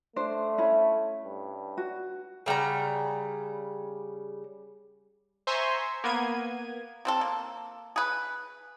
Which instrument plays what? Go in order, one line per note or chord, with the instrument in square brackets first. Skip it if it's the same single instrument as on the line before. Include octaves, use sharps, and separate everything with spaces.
[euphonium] A3 [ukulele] D4 C5
[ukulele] C#4 E4 B5
[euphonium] G2
[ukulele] F#4
[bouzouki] C#3 G3 F#5 A#5
[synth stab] C5 E5 G#5 A#5 C6 C#6
A#3 B3 G#6 D#7
[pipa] C3 C4 A4
A#3
G#4 B4